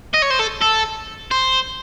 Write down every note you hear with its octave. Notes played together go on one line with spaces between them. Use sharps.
D#5
C#5
C5
A4
A4
C5